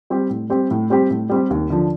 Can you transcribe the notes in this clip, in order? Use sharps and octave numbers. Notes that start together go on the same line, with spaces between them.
G3 C4 G4
A2
G3 C4 G4
A2
G3 C4 G4
A2
G3 C4 G4
D#2
D3 F3